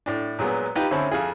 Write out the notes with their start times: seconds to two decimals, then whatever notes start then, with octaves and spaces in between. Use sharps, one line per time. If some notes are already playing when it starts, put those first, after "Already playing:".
0.06 A2 D4
0.39 A#2 F#3 G#3 B3
0.76 D#4 F4 G4 B4
0.91 D2 C4 C#4 E5 A5 B5
1.11 F2 F4 G#4